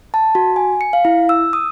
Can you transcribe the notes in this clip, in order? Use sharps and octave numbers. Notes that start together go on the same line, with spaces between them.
A5
F#4
G#5
C#7
F5
E4
E6
D#6